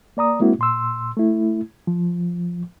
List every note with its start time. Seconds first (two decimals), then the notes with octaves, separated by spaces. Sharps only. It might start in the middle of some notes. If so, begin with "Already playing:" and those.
0.17 A#3 D5 A#5 D#6
0.40 G#3 A#3 C4 E4 F#4
0.59 A#2 C6 E6
1.17 A3 E4
1.87 F3